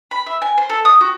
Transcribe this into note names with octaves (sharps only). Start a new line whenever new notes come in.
B5
E5
G#5
C5
A4
D#6
F#4